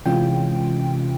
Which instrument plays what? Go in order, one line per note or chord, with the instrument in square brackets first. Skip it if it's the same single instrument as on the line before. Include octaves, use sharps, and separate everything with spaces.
[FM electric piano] C3 E3 G#3 C#4 F4 G5